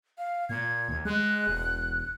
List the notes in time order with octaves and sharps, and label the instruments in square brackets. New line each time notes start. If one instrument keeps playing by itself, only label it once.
[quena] F5
[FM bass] A#2 [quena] G#6
[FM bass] D#2
[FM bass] G#3 [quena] F#6
[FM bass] E1